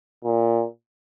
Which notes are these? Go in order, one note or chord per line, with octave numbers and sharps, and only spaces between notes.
A#2